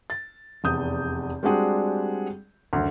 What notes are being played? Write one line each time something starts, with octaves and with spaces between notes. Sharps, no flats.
A6
F1 E2 D#6 G6
G3 G#3 C4 D4 F#4 G#4
F#1 D2